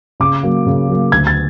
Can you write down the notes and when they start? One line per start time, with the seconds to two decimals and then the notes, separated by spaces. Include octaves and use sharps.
0.20 C#3 D6
0.43 F#3 A#3
0.66 C#3
0.89 F#3 A#3
1.12 D2 G#6
1.27 A6